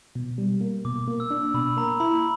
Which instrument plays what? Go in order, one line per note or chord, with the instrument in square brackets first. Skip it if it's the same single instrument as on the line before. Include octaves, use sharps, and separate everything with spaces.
[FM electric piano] B2
G3
A#3
[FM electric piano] B2 [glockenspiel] D6
[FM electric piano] A#3
[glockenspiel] E6
[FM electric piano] D4
[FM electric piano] B2 [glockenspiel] B5
[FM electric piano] A#3 [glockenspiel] A#5
[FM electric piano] E4 [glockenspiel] B5